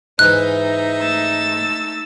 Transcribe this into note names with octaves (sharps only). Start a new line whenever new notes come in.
G#2 E3 D#4 E5 F#6
A3 E6 A6